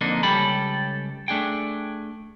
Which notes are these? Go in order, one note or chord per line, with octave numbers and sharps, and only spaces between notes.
F2 D3 A#3 D4 D#4
C#2 G3 C#4 G4 A4 B5
A3 D4 G#4 G5